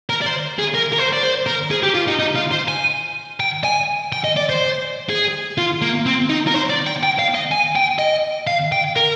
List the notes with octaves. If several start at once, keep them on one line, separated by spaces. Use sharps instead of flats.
A#4
D5
C5
G#4
A#4
A#4
C5
D5
C5
A#4
G#4
G4
F4
D#4
D#4
F4
C5
G#5
G5
G#5
G5
D#5
D5
C5
G#4
F4
A#3
C4
D#4
A#4
C5
D5
G5
G5
F5
D#5
G#5
G5
D#5
F5
G5
A#4